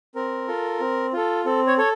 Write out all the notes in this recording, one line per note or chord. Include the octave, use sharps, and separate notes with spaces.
C4 A#4
F4 A4
C4
F4 A4
C4 A4
C#5
A4 C#5